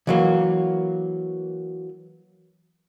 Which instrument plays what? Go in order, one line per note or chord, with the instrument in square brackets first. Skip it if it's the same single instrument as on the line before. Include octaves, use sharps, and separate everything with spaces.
[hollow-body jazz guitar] E3 F#3 A#3